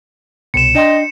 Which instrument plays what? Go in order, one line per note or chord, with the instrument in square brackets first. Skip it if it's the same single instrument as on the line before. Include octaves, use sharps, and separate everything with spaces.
[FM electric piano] C2 B2 [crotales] C#7 E7
[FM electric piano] D4 G5 C6 [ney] D#5